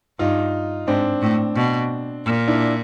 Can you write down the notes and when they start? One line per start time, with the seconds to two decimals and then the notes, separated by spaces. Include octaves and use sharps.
0.19 G2 D#4 F4
0.87 G#2 C4 D4
1.22 A2
1.56 B2
2.25 A#2
2.48 D4 E4